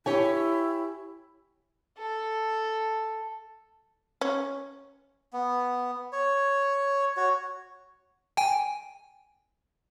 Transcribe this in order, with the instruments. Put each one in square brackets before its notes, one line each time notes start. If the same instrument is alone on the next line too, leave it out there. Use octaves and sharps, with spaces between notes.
[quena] E4 [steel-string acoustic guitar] G4 C#5 G#5
[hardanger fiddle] A4
[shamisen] C#4
[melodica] B3
C#5
F#4 C#5
[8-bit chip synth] G5 G#5